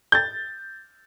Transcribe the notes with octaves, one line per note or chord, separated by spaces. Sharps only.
G6 A6